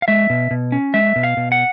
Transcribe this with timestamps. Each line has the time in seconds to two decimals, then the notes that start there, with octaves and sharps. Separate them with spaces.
0.02 F5
0.08 G#3 E5
0.30 B2
0.51 B2
0.72 C#4
0.94 G#3 E5
1.16 B2
1.23 F5
1.37 B2
1.52 F#5